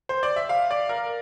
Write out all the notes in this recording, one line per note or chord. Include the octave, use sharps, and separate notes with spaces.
C5
D5
E5
F5
D5
A#4